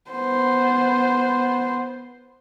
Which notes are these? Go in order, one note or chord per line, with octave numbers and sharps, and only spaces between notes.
B3 C5